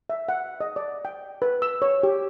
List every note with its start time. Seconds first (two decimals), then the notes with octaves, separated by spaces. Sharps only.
0.10 E5
0.29 F#5
0.61 D#5
0.76 D5
1.05 G5
1.42 B4
1.62 E6
1.82 C#5
2.03 G4